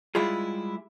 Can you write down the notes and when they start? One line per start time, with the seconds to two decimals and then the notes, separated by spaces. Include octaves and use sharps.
0.15 G3 G#3 E4 F4 G#4